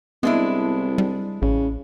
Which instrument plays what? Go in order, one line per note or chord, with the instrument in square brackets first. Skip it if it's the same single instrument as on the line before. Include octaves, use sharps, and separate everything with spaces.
[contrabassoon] C2 [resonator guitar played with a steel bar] G#3 D4 E4 [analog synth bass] B3
[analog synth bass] G3
[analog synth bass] A1 [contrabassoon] C#3